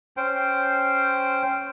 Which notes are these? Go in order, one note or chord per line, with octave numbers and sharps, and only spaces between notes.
C#4 C5 G5